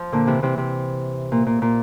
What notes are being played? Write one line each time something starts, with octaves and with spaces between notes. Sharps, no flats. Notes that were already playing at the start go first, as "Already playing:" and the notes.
Already playing: F3
A#2 D3
C3 E3
C3 E3
C3
A#2
A#2
A#2